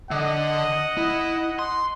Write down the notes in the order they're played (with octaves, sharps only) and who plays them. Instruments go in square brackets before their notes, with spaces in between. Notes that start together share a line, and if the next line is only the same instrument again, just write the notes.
[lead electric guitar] D3 [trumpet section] D#5 F#5
[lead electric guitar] E4
C6